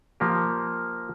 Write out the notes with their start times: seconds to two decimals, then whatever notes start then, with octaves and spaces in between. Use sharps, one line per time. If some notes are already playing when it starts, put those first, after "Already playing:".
0.20 F3 A#3 G4